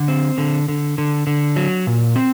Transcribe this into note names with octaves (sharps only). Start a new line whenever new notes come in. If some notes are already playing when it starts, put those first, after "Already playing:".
Already playing: D3
C4
D3
D3
D3
D3
F#3
A#2
C4